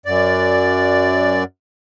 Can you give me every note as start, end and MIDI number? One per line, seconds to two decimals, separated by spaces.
0.06 1.44 42
0.06 1.44 74